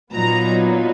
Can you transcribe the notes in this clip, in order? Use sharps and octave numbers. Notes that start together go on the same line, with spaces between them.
A#2 F#3 B3 D#4 A#5